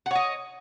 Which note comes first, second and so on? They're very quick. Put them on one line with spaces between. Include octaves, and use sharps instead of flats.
F#5 C#5 D#5